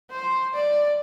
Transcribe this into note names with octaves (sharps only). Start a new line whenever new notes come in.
C5
D5